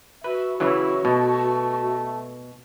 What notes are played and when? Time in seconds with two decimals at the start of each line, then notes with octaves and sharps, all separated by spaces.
0.24 F#4 B4 E5
0.60 C#3 E3 F#3 E4
1.05 B2 A3